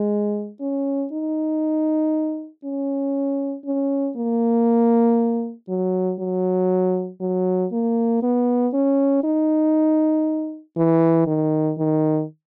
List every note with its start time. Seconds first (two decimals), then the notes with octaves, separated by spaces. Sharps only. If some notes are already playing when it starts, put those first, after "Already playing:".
Already playing: G#3
0.61 C#4
1.12 D#4
2.64 C#4
3.65 C#4
4.16 A#3
5.68 F#3
6.19 F#3
7.20 F#3
7.72 A#3
8.22 B3
8.73 C#4
9.23 D#4
10.77 E3
11.27 D#3
11.78 D#3